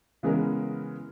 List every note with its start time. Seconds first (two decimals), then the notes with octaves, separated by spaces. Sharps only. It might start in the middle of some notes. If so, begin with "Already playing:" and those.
0.23 C#3 E3 G#3 B3 C#4 A#4